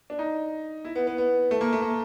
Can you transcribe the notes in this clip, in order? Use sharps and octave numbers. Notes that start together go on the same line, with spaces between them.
D4
D#4
E4
B3
B3
B3
A3
A#3
A3
A#3